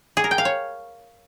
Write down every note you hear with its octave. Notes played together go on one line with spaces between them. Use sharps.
G#4
A#4
G5
F5
C#5